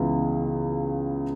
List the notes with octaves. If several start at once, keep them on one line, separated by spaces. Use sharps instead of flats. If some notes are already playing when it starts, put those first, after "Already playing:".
Already playing: C#2 C#3 E3 B3